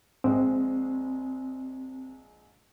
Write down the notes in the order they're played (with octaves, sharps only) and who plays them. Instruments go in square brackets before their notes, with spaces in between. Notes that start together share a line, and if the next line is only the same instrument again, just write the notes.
[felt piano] A#1 G#3 D#5 [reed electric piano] C4